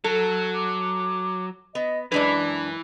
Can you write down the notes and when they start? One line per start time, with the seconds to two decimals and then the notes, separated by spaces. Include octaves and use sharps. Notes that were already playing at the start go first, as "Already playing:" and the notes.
0.04 F#3 A4
0.52 D6
1.75 B3 D#5
2.12 F#2 E3 G#3 D4 B4 B5